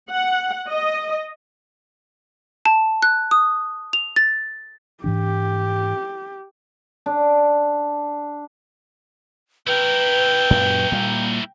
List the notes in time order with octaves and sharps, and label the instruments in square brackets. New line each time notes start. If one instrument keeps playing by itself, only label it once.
[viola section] F#5
D#5
[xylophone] A5
F#6
D#6
F7
A6
[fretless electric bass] G#2 E3 D4 [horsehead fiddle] G4
[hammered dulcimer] D4
[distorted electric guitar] E4 A#4 [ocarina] B4 [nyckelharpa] G5
[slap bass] F#2 A#2
A#2 G3 A#3